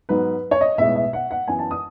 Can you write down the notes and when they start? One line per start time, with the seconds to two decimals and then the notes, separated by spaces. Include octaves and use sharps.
0.09 G#2 F#3 B3 B4
0.51 C#5
0.61 D#5
0.78 B1 A2 G#3 B3 E5
0.96 E5
1.13 F#5
1.31 F#5
1.47 F#2 E3 B3 G#5
1.59 A5
1.71 D#6